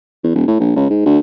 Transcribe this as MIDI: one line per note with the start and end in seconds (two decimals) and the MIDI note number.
0.24 0.34 40
0.35 0.44 27
0.48 0.56 45
0.60 0.71 34
0.76 0.86 37
0.90 1.01 44
1.05 1.19 38